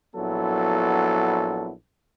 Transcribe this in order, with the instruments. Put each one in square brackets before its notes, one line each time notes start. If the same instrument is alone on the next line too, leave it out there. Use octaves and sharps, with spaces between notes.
[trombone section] A#1 F#3 B3 E4 A4